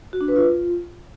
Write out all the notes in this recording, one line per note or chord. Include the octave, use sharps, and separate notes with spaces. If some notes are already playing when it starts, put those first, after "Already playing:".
F#4
D4
B4
F4